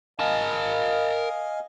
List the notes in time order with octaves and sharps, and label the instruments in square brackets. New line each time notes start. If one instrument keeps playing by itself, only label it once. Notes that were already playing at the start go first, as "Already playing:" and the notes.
[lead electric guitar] A#4 A5 [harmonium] D#5 F5 G#5